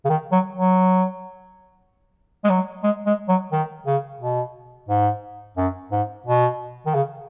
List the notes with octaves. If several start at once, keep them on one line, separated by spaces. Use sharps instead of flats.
C#3
D#3
F#3
F#3
G#3
F#3
G#3
G#3
F#3
D#3
C#3
B2
G#2
F#2
G#2
B2
D#3
C#3